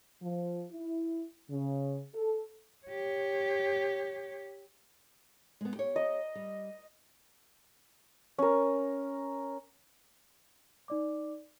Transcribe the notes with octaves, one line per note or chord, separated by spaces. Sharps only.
F3
E4
C#3
A4
G4 C#5
G#3 B3
G4 C#5
D#5
G3
C#4 A#4
D#4 D5 D6